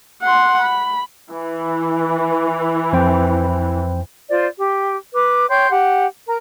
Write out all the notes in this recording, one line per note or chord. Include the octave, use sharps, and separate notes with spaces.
F#5 C6
B5
E3
F2 C5 G5
F4 C5 D5
G4
B4 D6
C#5 G5 C6 G6
G4 F#5
A#4 A#5